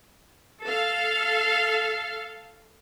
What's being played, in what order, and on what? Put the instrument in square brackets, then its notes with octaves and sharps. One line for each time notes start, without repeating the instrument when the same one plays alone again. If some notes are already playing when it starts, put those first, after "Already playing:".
[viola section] A4 F5